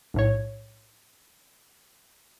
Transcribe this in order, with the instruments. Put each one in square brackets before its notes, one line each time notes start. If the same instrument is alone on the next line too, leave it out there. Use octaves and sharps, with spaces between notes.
[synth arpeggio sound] B1 A2 C#5